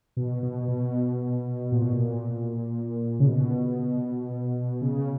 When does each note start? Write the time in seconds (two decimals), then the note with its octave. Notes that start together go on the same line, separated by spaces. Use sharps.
0.17 B2
0.43 B2
0.68 B2
1.72 A#2
1.82 B2
1.93 A#2
3.20 C#3
3.26 B2
4.81 C#3